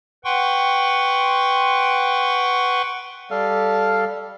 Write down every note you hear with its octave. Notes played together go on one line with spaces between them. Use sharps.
B4 F#5 G5 C6 C#6
G3 A4 F5